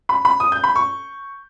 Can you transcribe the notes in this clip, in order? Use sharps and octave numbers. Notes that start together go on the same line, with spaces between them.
B5
B5
D#6
G6
B5
C#6